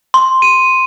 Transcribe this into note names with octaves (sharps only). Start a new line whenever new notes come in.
C6
D#7